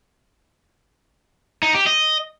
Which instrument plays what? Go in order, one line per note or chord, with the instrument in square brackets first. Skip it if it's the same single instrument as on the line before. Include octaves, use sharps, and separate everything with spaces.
[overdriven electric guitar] D#4
G4
D#5